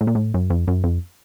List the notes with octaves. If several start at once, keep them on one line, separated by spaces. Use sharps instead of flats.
A2
A#2
A2
F#2
F2
F#2
F2